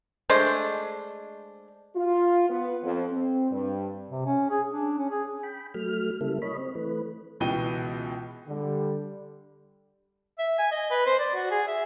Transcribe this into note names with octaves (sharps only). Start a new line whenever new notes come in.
G#3 A3 D4 C5
F4
B3
F2
C4
G2
C3
C#4
G#4
D4
C#4
G#4
G5 B5
F#3 A3 F6
C#3 G3 A#3 E4 A4
C#5 D#5 B5
C4
E3 A3 B4
C#2 B2 E3 G5 D#7 G7
D3 G3
E5
G#5
D#5
B4
C5
D5
F#4
G#4
E5